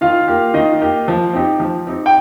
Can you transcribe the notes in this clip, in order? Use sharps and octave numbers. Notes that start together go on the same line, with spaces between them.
D#3 F4 F5
A#3 G4
D#3 D#5
A#3 G4
F3
C4 D#4 G4
F3
C4 D#4 G4
G5